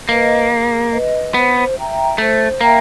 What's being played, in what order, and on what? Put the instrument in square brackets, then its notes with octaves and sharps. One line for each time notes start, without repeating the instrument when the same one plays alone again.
[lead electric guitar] A#3 [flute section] B4 D#5
[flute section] G#4
B4 D#5
[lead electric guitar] B3 [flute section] C5
[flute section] E5 G5 A#5
[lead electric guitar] A3 [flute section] C5
[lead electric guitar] A#3 [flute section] E5 G5 A#5